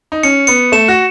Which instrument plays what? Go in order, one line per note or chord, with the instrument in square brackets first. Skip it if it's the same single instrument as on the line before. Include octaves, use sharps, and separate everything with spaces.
[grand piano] D#4
[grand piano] C#4 [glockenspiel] C#7
[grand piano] B3 [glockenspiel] C#7
[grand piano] A3 [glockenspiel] E7
[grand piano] F#4